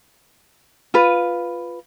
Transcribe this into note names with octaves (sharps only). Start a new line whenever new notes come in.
F4 B4